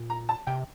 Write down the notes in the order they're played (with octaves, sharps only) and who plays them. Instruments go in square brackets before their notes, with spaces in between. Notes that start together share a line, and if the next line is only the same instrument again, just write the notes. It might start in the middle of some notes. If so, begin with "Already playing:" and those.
Already playing: [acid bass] A#2
[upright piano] A#5
A5
[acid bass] C3 [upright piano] G5